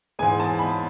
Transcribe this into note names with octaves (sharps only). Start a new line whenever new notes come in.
G#2 E3 G#3 G#5
A5
B5